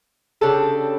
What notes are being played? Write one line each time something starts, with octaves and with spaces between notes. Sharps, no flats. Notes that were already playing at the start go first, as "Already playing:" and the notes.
C#3 G3 D4 A4